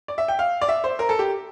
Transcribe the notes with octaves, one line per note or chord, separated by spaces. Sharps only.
D5
E5
G5
F5
D5
E5
C5
A#4
A4
G4